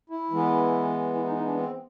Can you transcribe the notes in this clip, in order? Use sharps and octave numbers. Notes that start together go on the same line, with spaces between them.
E4
E3 G#3 B3
E4
D#4
D#4
D4
C4